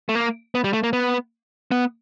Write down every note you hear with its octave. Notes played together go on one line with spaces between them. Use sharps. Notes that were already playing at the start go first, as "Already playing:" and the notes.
A3
A#3
B3
G3
A3
A#3
B3
B3